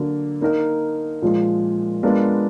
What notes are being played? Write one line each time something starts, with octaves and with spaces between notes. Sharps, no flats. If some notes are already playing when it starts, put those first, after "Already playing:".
Already playing: D3 F#3 A#3
A#3 D#4 A#4
A#2 F3 G#3
G#3 B3 D4 F4 A#4